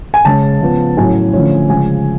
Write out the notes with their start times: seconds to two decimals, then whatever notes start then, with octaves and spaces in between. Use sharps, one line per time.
0.14 G#5
0.25 C#3 G#3 C#4 A5
0.61 C#3 F3 B3
0.97 A2 F#3 C#4 G#5
1.33 D3 F3 A3 C#4
1.70 C#3 F3 G#3 G#5